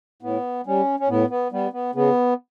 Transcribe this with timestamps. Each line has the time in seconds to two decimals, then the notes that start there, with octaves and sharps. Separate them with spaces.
0.22 A2 B3
0.67 G3 C#4
1.00 C#4
1.09 A2 B3
1.30 B3
1.52 G3 B3
1.73 B3
1.95 C#3 B3